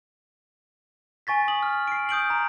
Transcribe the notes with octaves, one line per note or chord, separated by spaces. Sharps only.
G#5 C#6 A6 B6
D#6 F#7
F6
C7 D7
D#6 G6 D7 F#7
A#5